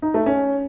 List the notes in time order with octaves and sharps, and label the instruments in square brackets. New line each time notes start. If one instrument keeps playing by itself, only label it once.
[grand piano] D#4
A3
C#4